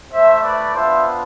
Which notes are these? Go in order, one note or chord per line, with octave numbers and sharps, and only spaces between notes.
A3 E4 C5 E5
B4 D5
B3 D4 F4 C5 E5